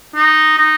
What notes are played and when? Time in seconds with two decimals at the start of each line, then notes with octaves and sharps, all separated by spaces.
0.15 D#4
0.58 D#4